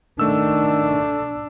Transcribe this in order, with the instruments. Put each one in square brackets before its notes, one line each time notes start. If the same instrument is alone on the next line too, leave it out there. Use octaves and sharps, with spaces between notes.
[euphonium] D#3 [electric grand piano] A3 E6 [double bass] D4